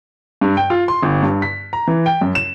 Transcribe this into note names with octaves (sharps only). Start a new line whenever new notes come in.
G2
G5
F4
C6
G1
G2
B6
A#5
E3
G5
F#2
E7